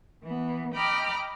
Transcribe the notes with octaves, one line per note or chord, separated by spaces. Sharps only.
E3 B3
D#5 G5 A#5 B5 D6 F6